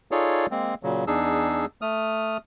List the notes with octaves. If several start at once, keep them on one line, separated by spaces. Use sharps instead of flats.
D#4 F4 G#4 A4 C#5 D5
G#3 A#3 C4
A#2 C#3 F#3
E2 D4 D#4 G#4 E6
A3 D#6 F6